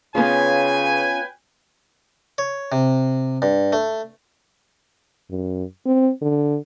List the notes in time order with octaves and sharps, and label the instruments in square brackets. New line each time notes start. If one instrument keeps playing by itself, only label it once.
[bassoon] C#3 [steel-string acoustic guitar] B3 C#4 F4 [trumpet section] B4 G5 G#5
[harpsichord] C#5
C3
G2
A3
[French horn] F#2
C4
D3